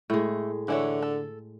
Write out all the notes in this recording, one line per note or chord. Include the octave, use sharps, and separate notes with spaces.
A2 G#3 A3
D3 E3 E4 C#5
A4